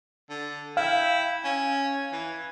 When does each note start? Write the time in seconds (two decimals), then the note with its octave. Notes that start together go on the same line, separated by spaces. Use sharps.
0.30 D3
0.77 E4 F5 G5
1.44 C#4 G#5
2.12 E3